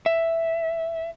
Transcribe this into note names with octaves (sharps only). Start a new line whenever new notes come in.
E5